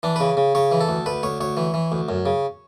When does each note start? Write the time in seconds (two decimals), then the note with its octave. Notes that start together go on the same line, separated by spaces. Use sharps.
0.03 E3 D4
0.16 C#3 B4
0.37 C#3
0.55 C#3 C#5
0.72 E3
0.81 A4
0.89 D2
1.06 D2 B4
1.23 D2 C#5
1.41 D2 C#5
1.57 E3
1.74 E3
1.92 D2
2.09 F#2
2.26 C#3